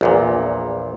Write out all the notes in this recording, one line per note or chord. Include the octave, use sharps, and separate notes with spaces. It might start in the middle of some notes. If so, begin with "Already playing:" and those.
A#1 E2 A#2